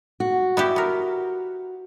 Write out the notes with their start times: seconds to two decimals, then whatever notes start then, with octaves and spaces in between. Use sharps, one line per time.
0.20 F#4
0.57 B3 E4 G4
0.76 B3 A#4